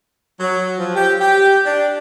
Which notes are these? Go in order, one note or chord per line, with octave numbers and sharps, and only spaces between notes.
F#3
F3
G4
G4
D4